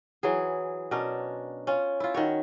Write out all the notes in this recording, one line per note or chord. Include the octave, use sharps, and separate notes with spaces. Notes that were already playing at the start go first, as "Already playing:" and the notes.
E3 F#3 G#4
B2 C#4 D4 A#4
C#4 F4
E4 F4
D#3 F#4 C#5